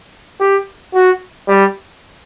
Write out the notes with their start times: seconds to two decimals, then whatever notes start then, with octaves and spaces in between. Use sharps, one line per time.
0.40 G4
0.95 F#4
1.48 G3